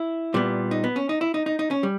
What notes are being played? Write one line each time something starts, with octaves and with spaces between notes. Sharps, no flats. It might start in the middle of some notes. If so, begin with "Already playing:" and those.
Already playing: E4
A#2 G3 B3
D#4
B3
C#4
D#4
E4
D#4
D#4
D#4
C#4
G3